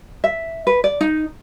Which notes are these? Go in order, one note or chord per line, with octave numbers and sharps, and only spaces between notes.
E5
B4
D5
D#4